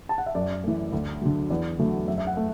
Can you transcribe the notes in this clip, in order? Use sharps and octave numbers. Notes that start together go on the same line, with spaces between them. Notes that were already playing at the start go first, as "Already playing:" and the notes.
A5
F#5
E5
F#2 D5
E3 A3
D2
D3 F#3
E2 D5
D3 F#3 A3
F#2 E5
E5
F#5
A3